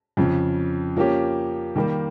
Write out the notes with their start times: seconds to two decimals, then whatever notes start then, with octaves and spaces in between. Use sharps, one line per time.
0.17 F2 C#3 F3
0.97 F3 A#3 C#4 G4
1.76 D#3 G3 A#3